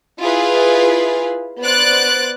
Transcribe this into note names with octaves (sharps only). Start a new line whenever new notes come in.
E4 F4 G#4 B4 F5
B3 C5 D5 F#6 A6 D7